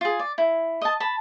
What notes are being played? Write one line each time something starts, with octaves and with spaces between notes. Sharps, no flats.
F4 G#4
D5
E4
D#5 A5
A5 B5